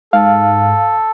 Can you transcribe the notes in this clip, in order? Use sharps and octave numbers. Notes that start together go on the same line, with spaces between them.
G#2 A4 F5